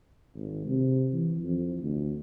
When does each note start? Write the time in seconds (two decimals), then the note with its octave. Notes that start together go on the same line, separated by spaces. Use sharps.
0.35 G#1
0.66 C3
1.13 E3
1.43 F2
1.80 D2